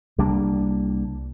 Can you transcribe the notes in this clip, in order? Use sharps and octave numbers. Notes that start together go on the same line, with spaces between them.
C2 G3 A#3 D4